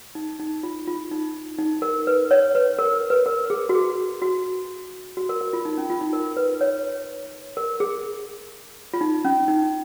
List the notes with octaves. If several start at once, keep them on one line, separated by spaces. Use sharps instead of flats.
D#4
D#4
F4
F4
D#4
D#4
A#4
B4
C#5
B4
A#4
B4
A#4
G#4
F#4
G#4
F#4
F#4
A#4
A#4
F4
D#4
C#4
F4
D#4
A#4
B4
C#5
A#4
G#4
F4
D#4
C#4
D#4